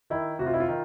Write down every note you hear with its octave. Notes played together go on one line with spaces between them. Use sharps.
D#3 E4
C3 F#4
F4
E4
F4
D#3